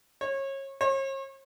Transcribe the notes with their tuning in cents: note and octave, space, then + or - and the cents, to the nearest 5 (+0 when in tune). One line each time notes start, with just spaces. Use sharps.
C#5 -30
C#5 -45